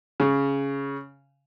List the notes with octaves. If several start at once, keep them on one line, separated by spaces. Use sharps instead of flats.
C#3